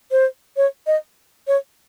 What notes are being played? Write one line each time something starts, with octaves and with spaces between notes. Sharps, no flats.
C5
C#5
D#5
C#5